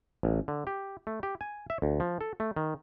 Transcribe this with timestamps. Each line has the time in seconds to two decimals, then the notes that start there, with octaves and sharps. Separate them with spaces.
0.23 A1
0.48 D3
0.67 G4
1.07 A3
1.23 G4
1.41 G#5
1.70 E5
1.82 D2
2.00 F3
2.21 A4
2.40 A3
2.56 D#3